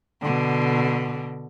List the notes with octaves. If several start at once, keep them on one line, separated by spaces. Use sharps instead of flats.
B2 D3